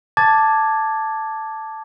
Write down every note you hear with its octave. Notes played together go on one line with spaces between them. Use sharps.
A5 D6 G#6 A6